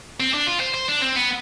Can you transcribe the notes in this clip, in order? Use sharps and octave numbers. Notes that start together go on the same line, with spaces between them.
C4
D4
F4
C5
C5
D4
C4
B3